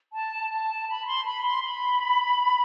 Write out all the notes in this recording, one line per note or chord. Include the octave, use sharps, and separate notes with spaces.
A5
A5
B5
C6
B5
C6
B5